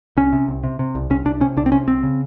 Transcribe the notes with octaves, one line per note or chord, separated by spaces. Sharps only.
C2 C#4
C3
C2
C3
C3
C2
C2 C#4
C2 D4
C3 C#4
C2 D4
C4
C3 C#4
C2 C4
C#3